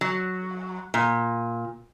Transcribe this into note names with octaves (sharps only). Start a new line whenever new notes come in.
F#3
A#2